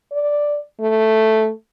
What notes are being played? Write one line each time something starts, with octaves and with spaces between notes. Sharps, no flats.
D5
A3